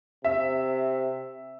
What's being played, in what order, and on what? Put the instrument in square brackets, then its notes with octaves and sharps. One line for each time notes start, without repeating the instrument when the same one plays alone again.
[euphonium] C3 [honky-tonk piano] E5